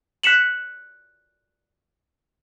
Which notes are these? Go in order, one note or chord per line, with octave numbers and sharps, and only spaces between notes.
F#6 B6 C#7 E7 F#7